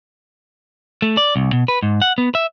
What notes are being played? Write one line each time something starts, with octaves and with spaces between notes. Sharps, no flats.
A3
D5
C2
B2
B4
G#2
F#5
B3
E5